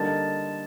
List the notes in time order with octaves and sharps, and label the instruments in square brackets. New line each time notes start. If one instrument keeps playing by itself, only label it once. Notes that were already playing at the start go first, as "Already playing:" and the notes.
Already playing: [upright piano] D3 G3 A#3 D#4 [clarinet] A5